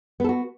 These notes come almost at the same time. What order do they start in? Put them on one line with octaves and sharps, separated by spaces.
B3 A4 F#4